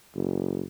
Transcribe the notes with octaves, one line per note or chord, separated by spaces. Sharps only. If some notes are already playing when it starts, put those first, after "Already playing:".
F#1